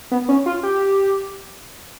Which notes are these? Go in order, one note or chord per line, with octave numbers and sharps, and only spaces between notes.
B3
C#4
F4
G4